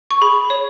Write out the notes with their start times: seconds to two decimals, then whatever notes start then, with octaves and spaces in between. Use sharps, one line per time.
0.11 C#6
0.22 G#4 B5
0.50 C#5